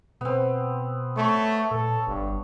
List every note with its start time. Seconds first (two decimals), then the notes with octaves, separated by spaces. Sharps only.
0.21 B2 B3 C4
1.17 A3 C#5 C#6
1.71 A#2 A4
2.07 G1 G2